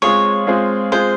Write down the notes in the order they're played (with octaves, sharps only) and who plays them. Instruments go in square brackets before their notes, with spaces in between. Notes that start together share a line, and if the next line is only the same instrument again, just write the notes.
[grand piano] G#3 C4 F4 G#4 [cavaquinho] C#5
[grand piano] G#3 C4 F4 G#4
[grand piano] G#3 C4 F4 G#4 [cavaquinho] C5